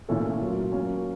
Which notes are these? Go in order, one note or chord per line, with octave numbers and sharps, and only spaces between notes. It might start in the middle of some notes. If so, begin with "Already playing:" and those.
A#2 A3 C#4 A4
F#3 A#3 F4
F#3 A#3 C#4